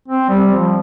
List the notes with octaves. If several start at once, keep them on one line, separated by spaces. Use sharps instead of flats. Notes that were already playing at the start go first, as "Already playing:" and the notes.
C4
G3
F3